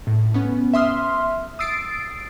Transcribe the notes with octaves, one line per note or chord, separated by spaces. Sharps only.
A2
B3 C#4
E5 C6 D#6 F6
D#6 E6 A6 C7 D7